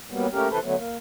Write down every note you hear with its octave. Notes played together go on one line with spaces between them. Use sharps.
F#3 G3 A#3 B3
A3 A#3 C#4 G4 A#4
C3 E3 A4 B4 C5
D3 F#3 A3 B3
A#3